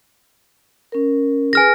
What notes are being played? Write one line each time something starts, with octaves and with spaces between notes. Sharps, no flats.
C#4 A#4
G#4 B4 G#5 F6 A#6